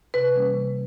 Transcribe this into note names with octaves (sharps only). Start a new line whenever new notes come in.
C3 B4
E3 G3 A#3 C#4
C3